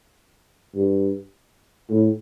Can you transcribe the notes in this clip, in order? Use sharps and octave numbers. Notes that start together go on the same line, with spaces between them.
G2
A2